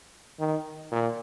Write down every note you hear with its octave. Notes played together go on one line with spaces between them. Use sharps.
D#3
A#2